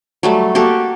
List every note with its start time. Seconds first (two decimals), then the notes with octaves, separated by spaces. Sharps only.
0.23 F#3 G3 A3
0.55 A#3 F#4 G4 A4